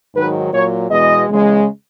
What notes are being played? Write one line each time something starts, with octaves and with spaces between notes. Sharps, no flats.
G#2 D#3 F#3 B4
A#2 F#3 C#5
E2 B2 G#3 D#5
E2 C#3 G#3